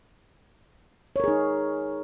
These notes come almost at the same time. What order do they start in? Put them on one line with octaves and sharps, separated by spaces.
C#5 A#4 G#4 D#4